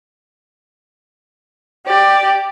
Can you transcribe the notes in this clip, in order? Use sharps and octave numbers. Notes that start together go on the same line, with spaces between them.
G4 D5